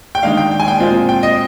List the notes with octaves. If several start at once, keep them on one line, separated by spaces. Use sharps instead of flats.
G5
D#3 G#3 D4 F5
G5
G5
G#5
G5
A#2 G#3 C4 F4
G5
D#5